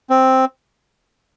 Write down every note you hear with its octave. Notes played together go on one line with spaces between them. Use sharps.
C4